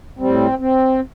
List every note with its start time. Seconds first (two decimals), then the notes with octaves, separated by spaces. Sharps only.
0.19 A2 G3 C4
0.59 C4